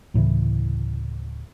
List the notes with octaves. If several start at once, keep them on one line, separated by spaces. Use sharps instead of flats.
D2 A2 C#3 E3